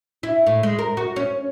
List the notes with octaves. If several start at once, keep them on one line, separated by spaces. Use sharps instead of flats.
E4
A2
G#3
A#4
F#4
C#4